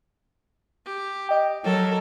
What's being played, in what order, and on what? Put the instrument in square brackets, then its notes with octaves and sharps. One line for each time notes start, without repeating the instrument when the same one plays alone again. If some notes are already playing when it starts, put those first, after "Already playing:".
[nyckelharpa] G4
[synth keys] D#5 G5
[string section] F#3 [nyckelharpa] A4 A#4